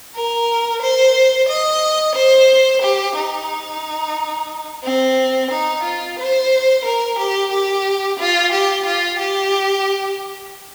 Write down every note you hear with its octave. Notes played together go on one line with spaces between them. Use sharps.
A#4
C5
D#5
C5
G4
D#4
C4
D#4
F4
C5
A#4
G4
G4
F4
G4
F4
G4